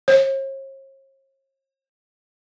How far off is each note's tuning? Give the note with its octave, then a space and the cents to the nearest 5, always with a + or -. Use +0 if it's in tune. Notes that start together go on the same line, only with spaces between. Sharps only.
C#5 -45